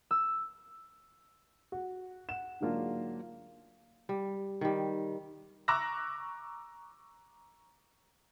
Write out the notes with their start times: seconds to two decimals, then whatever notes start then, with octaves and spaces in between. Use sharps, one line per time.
0.11 E6
1.72 F#4
2.29 F#5 E7
2.60 G#2 D3 F#3 A#3 D4 F4
4.09 G3
4.61 D#3 G3
5.68 A#5 C#6 D6 E6 F#6 A#6